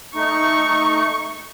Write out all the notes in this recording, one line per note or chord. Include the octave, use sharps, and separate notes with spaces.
A3 D#4 C#6